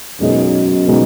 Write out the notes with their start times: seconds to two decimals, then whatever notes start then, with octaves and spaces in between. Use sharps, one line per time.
0.21 F#2 B2 G#3 D#4 G#4 D#5
0.88 B2 G#3 D#4